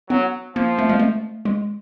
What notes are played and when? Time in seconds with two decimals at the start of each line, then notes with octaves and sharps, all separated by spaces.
0.10 F#3 B3
0.56 F3 A#3
0.79 A3
0.89 G#3
0.99 A3
1.45 G#3